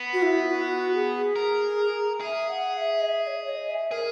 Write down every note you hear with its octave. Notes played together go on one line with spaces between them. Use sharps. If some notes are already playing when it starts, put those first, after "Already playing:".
Already playing: B3
F#4
E4
F#4
G#4
A#4
G#4 E5
F#5
E5
D#5
E5
C#5
D#5
E5
G#4 A#4